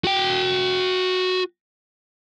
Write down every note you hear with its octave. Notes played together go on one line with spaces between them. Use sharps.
F#4 G5